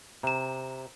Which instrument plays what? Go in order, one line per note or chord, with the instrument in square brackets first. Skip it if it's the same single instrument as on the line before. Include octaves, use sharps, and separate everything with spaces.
[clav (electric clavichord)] C3 [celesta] A#5 E7